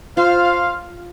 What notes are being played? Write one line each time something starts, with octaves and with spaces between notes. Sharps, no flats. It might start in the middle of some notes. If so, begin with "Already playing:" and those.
F4 C5 F5